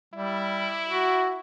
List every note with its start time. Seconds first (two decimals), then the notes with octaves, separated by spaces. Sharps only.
0.14 G3 E4
0.89 F#4